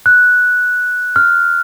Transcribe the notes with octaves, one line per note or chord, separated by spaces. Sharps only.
F#6
F6